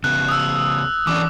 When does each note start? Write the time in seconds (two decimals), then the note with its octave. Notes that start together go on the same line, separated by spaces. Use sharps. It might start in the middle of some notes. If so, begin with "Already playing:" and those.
0.04 C#3 B3 F#6
0.29 D#6 E6
1.07 E3 C#4 D4 D6